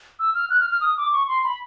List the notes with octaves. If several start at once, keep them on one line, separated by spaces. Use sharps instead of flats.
E6
F6
F#6
F6
F6
D#6
D6
C#6
C6
B5